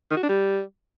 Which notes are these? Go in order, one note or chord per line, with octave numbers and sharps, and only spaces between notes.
D#3
F#4
D4
G3